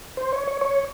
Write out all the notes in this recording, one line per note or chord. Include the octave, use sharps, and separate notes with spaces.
C5
C#5
C#5
C#5